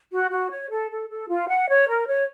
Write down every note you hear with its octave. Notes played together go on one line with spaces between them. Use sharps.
F#4
F#4
C#5
A4
A4
A4
F4
F#5
C#5
A#4
C#5